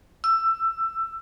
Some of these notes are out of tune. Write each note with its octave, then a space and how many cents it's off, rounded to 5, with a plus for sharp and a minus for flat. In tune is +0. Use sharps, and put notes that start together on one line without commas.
E6 +15